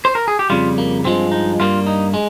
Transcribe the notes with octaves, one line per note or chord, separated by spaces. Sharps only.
C5
A#4
G#4
G4
F2 C#3 G3 F4
A#3
G2 F3 G#3 C4
D#4
G2 G3 A#3 F4
D#4
G#3